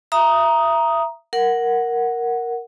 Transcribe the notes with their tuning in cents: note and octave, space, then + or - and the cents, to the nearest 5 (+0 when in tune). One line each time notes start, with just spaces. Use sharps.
E5 +25 A#5 +10 D#6 +0
A#4 +0 F#5 +0